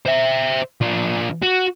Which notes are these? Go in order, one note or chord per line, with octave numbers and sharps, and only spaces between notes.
C5 E5
F3 D4
F#4